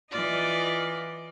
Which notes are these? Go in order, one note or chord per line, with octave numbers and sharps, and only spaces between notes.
E3 F4 D5 D#5